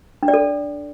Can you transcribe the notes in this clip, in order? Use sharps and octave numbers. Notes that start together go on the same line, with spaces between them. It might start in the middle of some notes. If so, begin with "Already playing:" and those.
D4
D5
A4